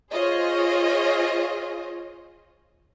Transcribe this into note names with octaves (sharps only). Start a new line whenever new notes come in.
F4 G#4 C5 C#5 D#5